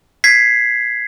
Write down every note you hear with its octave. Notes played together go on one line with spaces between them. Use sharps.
G#6 B6 C7